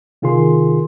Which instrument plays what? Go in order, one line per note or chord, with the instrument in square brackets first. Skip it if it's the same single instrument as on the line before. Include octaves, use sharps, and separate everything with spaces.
[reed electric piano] C3 D#3 F4 G#4 A#4 C6